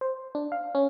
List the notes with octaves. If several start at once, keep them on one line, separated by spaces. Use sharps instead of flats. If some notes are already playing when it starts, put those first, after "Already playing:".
C5
D4
F5
C#4